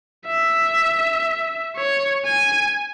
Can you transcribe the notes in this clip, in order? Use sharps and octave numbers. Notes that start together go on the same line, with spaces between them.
E5
C#5
G#5